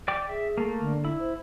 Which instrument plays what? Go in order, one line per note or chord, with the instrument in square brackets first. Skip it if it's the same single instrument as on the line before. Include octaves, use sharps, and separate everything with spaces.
[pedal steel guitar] D5 G5 D6
[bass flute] G#4 [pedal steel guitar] E5
[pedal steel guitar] A3 A#3
[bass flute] D3
[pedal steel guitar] E4
[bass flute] C5